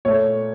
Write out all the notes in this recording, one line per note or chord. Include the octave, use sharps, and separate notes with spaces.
A#2 A3 C#5